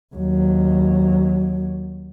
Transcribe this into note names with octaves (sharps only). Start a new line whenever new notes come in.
D#2 F#3